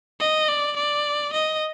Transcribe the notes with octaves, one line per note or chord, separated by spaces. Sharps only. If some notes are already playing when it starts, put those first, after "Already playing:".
D#5
D5
D5
D#5